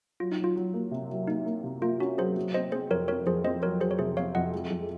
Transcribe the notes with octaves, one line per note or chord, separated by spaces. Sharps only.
F#3 F4
D#4
F#3
F4
F#3
A#3
C3
F#3
A#3 D#4
A#3
C3
A#3 F4
C#4 F#4
F#3 G#4 C5
F#3
C4 C5 D#5
C4 G#4 C5
F2 A#4 C#5
C4 A#4 C#5
F2 G#4 C5
C4 C5 D#5
F#3 A#4 C#5
F#3 G#4 C5
C#5
C3 G#4 C5
C3 C#5 F5
F2 D#5 F#5
G#3
F2